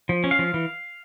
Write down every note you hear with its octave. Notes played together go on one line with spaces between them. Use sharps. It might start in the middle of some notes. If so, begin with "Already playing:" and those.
F3
C#4
F5
F3
E3